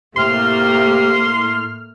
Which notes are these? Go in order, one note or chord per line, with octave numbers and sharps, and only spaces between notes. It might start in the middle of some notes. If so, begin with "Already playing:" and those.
A2 C3 A3 A#3 C6 F6